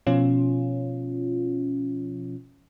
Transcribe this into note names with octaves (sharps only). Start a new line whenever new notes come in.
B2 F3 C#4 F4